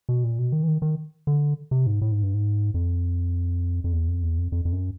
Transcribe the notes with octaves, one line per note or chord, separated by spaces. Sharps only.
B2
A#2
B2
D#3
E3
D#3
D#3
D3
C3
G#2
A2
G#2
G2
G#2
F2
F2
E2
F2
E2
F2
F2
F2
F#2